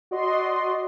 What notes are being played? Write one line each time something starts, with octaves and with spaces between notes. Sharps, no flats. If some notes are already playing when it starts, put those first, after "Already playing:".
F#4 D5 D#5 C6